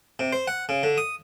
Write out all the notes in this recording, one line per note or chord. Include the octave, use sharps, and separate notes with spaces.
C3
C5
F#5
C#3
D3
D#6